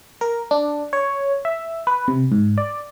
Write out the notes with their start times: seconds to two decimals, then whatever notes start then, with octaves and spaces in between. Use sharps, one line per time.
0.21 A#4
0.51 D4
0.93 C#5
1.45 E5
1.87 B4
2.08 C3
2.32 G#2
2.58 D5